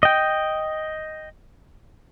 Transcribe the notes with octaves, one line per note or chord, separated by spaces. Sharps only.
D#5 G5